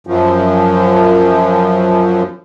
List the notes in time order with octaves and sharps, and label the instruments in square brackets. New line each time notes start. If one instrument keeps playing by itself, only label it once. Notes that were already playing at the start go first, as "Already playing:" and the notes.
[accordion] F#2 F3